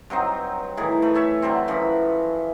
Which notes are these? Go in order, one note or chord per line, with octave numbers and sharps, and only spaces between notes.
G2 F#3 C4 D#4
A2 D#3 E3 G#4
A3 B5
C#5 E5 A5
D3 F#3 G3 C4
F#2 E3 F3 B5